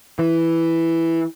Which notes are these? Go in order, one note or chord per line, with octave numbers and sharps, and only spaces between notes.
E3